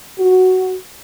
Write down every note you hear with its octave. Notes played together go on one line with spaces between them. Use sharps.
F#4